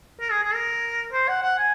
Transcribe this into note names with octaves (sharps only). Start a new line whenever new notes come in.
A#4
G#4
G#4
A#4
C5
F#5
F#5
G#5